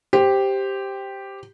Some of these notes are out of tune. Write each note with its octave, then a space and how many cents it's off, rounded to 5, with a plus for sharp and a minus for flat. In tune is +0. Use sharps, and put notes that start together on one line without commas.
G4 +0 C5 +0